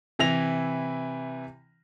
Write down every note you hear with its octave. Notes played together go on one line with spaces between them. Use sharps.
C3 E3 E4 A#6 F7